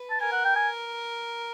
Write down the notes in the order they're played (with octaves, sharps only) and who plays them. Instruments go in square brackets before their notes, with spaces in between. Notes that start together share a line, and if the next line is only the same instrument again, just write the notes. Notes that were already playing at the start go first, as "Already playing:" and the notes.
Already playing: [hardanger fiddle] B4
[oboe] A5
[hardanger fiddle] A#4 [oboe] G#5
[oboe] F#5
G5
G#5